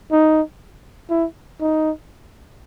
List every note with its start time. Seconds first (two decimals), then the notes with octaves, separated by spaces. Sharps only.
0.12 D#4
1.10 E4
1.61 D#4